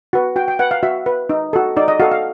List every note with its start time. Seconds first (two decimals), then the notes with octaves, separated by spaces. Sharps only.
0.13 F#4 B4
0.36 F#4 G5
0.48 G5
0.59 B4 F#5
0.71 F5
0.83 F#4 E5
1.06 B4
1.30 D#4
1.53 F#4 A4
1.76 D#4 D5
1.88 D#5
2.00 F#4 A4 F5
2.11 F5